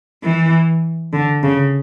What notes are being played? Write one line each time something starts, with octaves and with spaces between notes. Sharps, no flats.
E3
D3
C#3